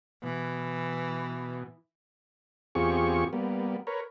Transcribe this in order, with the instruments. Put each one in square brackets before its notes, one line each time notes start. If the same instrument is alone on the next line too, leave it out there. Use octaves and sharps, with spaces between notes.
[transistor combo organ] B2 [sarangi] E3
[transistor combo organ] E2 C4 F4 G4 G#4 C#6
G3 A#3 B3
A#4 B4 C#5